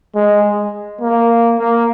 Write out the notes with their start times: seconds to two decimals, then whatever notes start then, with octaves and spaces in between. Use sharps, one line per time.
0.15 G#3
1.01 A#3
1.59 A#3